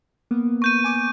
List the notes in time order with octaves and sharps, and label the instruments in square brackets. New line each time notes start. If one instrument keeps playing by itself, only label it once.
[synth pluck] A#3 B3
[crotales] C#6 G6 D#7
[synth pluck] G#5 D6